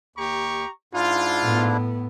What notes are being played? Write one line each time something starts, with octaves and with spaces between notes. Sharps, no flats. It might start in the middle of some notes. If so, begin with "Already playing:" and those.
D#2 G4 A#5 C#6
G#2 D4 E4 F4
A2 B3